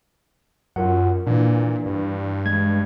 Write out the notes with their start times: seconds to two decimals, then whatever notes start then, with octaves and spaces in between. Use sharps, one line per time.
0.76 F#2 F4 A#4 F#5
1.27 A#2 E3 D4
1.86 G2
2.46 G#3 G#6